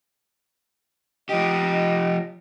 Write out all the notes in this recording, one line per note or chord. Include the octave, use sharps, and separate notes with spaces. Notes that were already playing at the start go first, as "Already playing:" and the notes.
F3 G4 D#5